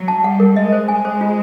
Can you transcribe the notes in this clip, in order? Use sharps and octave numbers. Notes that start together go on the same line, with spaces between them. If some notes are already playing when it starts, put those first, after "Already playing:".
Already playing: F#3
A5
G3 F#5
A#4
G#3 D#5
C5
G#3 G#5
C5
F4